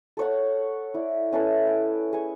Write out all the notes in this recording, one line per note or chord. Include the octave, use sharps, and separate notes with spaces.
A4 C#5 F#5
E4 D5
C#4 E4 A4 B4
G5
G#4 C#6